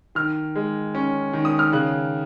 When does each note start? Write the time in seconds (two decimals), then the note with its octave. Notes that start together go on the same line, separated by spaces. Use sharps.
0.15 D#3 F6
0.56 G#3
0.95 C#4
1.33 D#3
1.45 D#6
1.59 F6
1.72 C#3 F#6